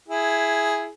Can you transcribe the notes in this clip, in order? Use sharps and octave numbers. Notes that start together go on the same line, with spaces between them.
E4 G#4